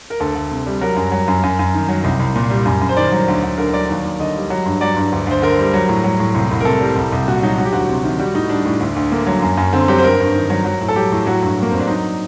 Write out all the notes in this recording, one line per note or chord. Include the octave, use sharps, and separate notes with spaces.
A#4
D2 A4
D2
C3
G3
F#3 A#4
F#2
F#3
F#2
F#2
F#2
D#3
F#3
C2
C2
A#2
G3
F#2
F#2
C5
D#3 D5
F#3
D2
D2
D3 A#4
F#3 D5
D#2
D#2
D3 D#5
G3
F#3
G2
F#3 D5
G2
D2
D2 C5
D3 A#4
G3
F#3
A2
F#3
A2
C2
C2
A#4
C3 A4
G3
C2
C2
A#2 F#4
F#3 D#4
F#3 F#4
G4
D2 F#4
C3
D#3
G3 F#4
A2 D#4
G3 D4
A2
D2
D2
D3 A#3
F#3
F#2
F#2
D3 C4
F#3 G4
C5
G2 A#4
G2
D#3
F#3
F#3
A2
A4
F#3 G4
A2
F#3 F#4
G2
F#3 A#3
G2 C4
D4
F#3 D#4